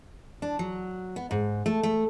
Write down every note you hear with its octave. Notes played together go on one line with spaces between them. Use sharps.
D4
F#3
B3
G#2
A3
A3